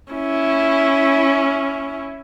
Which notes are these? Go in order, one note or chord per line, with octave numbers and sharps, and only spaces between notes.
C#4 E4